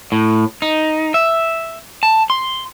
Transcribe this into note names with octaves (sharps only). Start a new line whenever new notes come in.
A2
D#4
E5
A5
C6